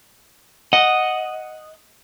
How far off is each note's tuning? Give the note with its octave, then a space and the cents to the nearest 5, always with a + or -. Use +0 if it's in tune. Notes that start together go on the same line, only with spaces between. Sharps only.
D#5 +0 F#5 +0